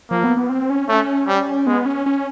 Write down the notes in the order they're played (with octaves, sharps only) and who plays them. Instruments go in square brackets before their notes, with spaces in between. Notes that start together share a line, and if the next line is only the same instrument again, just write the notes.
[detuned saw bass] F3 [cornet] A#3
[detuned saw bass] B3
B3
C4
C#4
[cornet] A3 [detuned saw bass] C#4
[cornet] G3
[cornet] G#3 [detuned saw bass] B3
[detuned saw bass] C#4
C#4